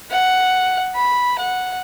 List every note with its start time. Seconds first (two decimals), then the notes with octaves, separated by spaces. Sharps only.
0.11 F#5
0.95 B5
1.38 F#5